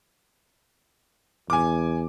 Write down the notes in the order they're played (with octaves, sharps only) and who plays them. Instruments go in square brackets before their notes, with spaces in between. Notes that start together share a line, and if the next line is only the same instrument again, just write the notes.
[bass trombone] E2 [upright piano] G#5 D6